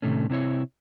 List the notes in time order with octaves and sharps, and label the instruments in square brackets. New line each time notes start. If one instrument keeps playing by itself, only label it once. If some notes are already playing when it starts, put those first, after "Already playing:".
[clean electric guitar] A2 C3 D#3 A3 C#4
C3 C4 E4 C#5